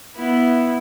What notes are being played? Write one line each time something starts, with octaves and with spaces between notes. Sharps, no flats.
B3 E4